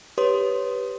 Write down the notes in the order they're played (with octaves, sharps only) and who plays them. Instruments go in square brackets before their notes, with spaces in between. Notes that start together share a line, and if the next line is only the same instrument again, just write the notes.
[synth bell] G4 B4 C#5 C6 D#6